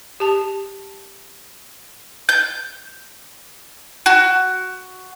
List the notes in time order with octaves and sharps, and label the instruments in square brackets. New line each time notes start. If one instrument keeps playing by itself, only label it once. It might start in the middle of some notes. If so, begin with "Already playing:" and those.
[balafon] G4 A5
[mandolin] G6
F#4